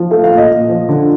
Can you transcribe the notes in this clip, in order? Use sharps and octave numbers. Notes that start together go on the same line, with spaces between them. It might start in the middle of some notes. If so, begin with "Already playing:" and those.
Already playing: F3
A3 F5
F5
A#2
D#5
A#2
F3
D3